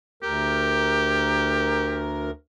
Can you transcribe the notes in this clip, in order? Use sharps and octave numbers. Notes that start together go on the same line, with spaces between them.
D2 G4 A#4